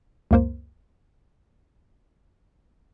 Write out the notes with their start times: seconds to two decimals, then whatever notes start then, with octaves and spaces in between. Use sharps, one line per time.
0.31 C#2 F#2 A#3 A#4 C5